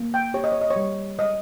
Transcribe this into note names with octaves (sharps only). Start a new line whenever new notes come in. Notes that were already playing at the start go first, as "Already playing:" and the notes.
Already playing: A#3
G5
G4 C#5
D#5
C#5
D#5
C#5
G3
G#3 D#5